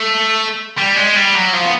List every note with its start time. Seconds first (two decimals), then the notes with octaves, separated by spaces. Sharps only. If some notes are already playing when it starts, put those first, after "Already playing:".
Already playing: A3
0.78 G3
0.96 G#3
1.16 G3
1.35 F#3
1.53 F3
1.65 B3